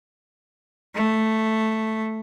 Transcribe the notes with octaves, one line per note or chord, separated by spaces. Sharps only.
A3